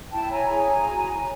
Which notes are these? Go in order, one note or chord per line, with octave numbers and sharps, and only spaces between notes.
E4 G5 A5
C#5 G#5 A#5
G#4 G#5 A#5
E4
F#4
C#5